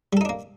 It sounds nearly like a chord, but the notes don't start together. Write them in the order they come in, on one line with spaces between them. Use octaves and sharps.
G3 A4 D#4 D4 A#3